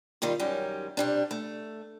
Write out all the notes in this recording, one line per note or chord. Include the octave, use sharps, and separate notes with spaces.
D#3 G3 D#4 F4
F#2 D#3 G3 C#4
C3 G3 D4
A3